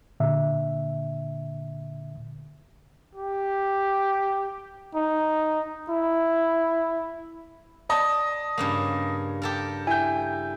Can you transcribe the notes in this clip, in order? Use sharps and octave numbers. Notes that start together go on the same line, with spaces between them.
A#2 D3 E5
G4
D#4
E4
D5 D#5 A5
G2 C#3 A#3
G4 A4 A#4
E4 G5 G#5 G6